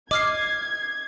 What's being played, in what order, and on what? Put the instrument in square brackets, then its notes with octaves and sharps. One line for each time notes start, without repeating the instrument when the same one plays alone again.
[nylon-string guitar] D#5 [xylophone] D6 F6 C7 [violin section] G#6